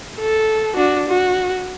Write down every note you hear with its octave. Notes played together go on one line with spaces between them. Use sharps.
A4
D4 F#4
F#4